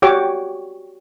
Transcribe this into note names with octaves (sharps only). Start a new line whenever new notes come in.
F#4 G4 C#5 D6